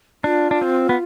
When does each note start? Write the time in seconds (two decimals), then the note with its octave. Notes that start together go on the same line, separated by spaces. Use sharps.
0.24 D4 F4
0.51 D4
0.61 C4
0.89 B3